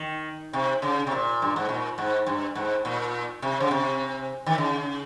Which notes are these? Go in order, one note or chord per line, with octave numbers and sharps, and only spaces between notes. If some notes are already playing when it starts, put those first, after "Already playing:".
Already playing: D#3
C3
C#3
C3
A#2
G2
G#2
A#2
G#2
G2
G#2
A#2
C3
C#3
C3
D#3
C#3